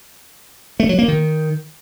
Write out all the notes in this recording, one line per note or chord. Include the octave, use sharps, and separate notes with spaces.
A3
F#3
A#3
D#3